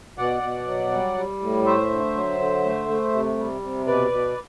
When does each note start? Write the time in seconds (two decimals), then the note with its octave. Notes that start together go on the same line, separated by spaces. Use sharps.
0.18 B2 D5 F#5
0.42 B2
0.66 F#3
0.92 G3
1.17 G3
1.40 A2
1.66 A3 C5 E5
1.90 D3
2.15 F#3
2.39 D3
2.65 A3
2.89 A3
3.13 C3
3.38 G3
3.63 C3
3.87 B2 B4 D5
4.12 B2